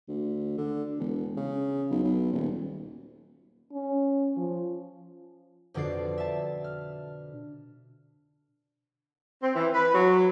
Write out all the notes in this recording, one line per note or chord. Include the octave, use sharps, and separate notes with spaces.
D2
D3
E1
C#3
B1
B1
D#1
C#4
F3
F2 B2 D3 D4 D5 C7
E5 A5
F6
C4
E3
B4
F#3